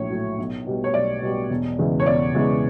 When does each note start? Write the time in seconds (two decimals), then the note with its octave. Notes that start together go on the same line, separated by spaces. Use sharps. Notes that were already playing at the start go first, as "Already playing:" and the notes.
Already playing: A#1 A2 F#3 A3 C#5
0.10 A2 F#3 A3
0.38 B1
0.66 B2 G3
0.84 C#5
0.94 B1 D5
1.22 B2 G3
1.50 E1
1.78 E2 C#3 E3 G#3
2.00 C#5
2.06 E1 D5
2.35 E2 C#3 E3 G#3